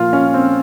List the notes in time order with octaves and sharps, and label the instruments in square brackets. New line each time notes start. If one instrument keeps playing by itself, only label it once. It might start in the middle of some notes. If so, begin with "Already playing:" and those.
Already playing: [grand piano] A#2 F3 F4
C#4
C4